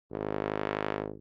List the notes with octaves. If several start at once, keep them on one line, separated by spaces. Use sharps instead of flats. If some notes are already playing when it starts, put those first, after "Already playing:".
G#1